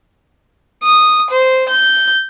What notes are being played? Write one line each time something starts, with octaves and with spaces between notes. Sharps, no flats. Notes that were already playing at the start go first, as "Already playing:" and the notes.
D#6
C5
G6